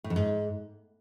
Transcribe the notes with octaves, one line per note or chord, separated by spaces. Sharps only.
A2
F2
G#2